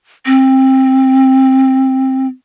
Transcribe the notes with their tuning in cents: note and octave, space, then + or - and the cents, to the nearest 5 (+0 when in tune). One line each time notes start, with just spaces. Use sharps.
C4 +15